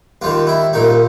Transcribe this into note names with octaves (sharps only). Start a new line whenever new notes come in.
D#2 D#3 F4
E4
C2 A#2 D#4